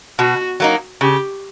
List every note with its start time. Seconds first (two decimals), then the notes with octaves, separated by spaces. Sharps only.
0.19 B2 F#4
0.60 F#3 A#3 D#4
1.01 C#3 G4